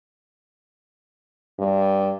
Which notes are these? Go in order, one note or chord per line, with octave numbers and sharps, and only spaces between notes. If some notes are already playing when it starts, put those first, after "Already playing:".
G2